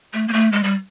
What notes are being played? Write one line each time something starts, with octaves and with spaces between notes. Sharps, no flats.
A3
A#3
A3
G#3
G3